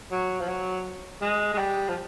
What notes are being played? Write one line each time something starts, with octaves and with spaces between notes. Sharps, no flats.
F#3
F3
F#3
G#3
G#3
G3
F3